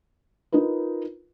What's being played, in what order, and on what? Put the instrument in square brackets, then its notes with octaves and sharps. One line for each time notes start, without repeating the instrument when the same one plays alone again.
[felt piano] D#4 F4 A#4 B4